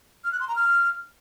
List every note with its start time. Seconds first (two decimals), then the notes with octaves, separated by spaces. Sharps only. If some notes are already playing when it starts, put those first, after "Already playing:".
0.24 F6
0.32 F#6
0.40 C6
0.48 A#5
0.56 F6